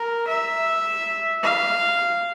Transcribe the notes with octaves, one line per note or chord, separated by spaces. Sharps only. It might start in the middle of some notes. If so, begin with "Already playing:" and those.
Already playing: A#4
E5
F5